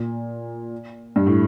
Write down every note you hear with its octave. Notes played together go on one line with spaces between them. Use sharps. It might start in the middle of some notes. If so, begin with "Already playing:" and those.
Already playing: A#2
G2
A2